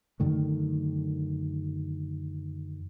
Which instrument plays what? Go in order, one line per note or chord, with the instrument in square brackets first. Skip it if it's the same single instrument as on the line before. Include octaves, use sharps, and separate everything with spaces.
[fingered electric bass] F#2 D3 D#3 A3